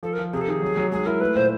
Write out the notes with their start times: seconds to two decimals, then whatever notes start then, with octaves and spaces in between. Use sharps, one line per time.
0.03 F3 A4
0.13 A#4
0.18 F3
0.33 C3 G#4
0.41 A4
0.48 D#3 G#4
0.62 F#3
0.77 F#3
0.92 G#3 G#4
1.06 E4 A#4
1.20 A3 B4
1.35 A#2 C5